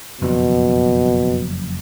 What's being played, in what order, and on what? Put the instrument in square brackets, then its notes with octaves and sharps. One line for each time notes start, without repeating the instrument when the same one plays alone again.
[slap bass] F#1 F2 G3 [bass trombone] B2